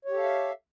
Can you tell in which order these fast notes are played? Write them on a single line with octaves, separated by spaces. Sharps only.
C#5 G4 A4 F5 E5